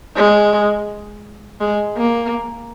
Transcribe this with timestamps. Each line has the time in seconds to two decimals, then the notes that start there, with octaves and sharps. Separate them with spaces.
0.16 G#3
1.60 G#3
1.97 A#3